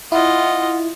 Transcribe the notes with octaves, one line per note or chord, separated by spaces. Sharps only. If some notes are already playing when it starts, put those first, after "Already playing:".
E4 F4 D#5 F#5